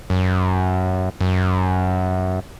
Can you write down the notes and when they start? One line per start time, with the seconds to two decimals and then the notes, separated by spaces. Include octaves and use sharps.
0.10 F#2
1.21 F#2